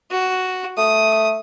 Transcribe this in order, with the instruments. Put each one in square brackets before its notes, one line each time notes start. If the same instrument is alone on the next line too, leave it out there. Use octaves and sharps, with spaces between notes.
[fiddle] F#4
[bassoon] A3 [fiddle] D#6